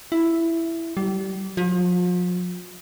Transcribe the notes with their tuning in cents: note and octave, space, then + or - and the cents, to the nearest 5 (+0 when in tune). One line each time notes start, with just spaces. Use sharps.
E4 +5
G3 -30
F3 +40